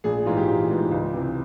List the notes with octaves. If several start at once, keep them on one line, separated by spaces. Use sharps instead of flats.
A#1 G#4
G#2 E3 F4
G4
A#1 F4
G#2 E3
C#2
C3 E3